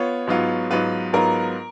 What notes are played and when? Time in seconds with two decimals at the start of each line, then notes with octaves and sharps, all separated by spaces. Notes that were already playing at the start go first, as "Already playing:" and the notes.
Already playing: B3 F4 C#5
0.27 G#2 F#3 B3 F4
0.70 G#2 F#3 B3 F4 B4
1.13 G#2 F#3 B3 F4 A#4